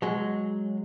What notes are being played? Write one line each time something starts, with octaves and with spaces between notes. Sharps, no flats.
F#3 G#3